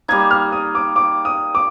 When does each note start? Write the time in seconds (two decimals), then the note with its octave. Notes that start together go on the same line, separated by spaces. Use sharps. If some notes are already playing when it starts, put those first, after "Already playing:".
0.08 G3 A#3 D#4 G#6
0.31 F6
0.52 D#6
0.75 D6
0.96 D6
1.25 D#6
1.55 D6